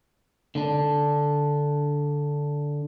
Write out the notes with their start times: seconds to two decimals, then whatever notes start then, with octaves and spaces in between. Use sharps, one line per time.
0.55 D3 D4